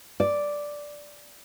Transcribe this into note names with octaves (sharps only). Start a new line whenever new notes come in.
D5